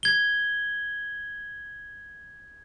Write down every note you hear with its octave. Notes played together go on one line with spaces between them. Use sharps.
G#6 G7